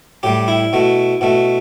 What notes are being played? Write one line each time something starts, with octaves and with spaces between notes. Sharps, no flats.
A2 G3 G4
E4
B2 A3
B2 A3